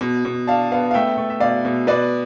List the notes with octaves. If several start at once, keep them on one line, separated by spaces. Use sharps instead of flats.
B2
B2
D4 F5 A5
B3 F5 A5
F5
A3 E5 G5
A3
E5
B2 D5 F5
B2
B2 B4 D5